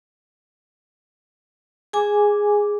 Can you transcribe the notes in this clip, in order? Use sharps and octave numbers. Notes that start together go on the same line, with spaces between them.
G#4 G#5 D6